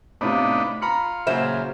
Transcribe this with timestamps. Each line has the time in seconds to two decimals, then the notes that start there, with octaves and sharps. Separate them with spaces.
0.21 A2 C3 B3 D4 D#4 F4
0.82 F4 A#5 B5 C#7
1.27 A#2 C#3 F#3 C5 E5